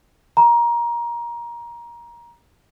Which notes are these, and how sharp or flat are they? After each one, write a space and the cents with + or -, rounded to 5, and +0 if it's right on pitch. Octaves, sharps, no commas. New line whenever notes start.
A#5 +20